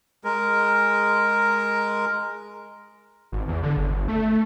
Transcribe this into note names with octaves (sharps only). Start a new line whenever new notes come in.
G#3 A#4
G#1
E2
D3
G1
G1
A3